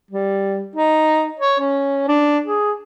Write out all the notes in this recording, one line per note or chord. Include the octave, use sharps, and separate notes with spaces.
G3
D#4
C#5
C#4
D4
G#4